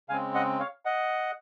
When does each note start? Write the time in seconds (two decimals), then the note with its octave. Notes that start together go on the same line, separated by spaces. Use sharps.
0.09 C#3 G#3 C4 F5 G#5
0.35 D#5 F#5
0.60 C#5 F5
0.85 D#5 F#5